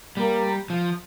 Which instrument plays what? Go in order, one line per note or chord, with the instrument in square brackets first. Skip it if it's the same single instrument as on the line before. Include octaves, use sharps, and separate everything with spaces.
[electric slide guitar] G3 [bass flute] A#3
[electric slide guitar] F3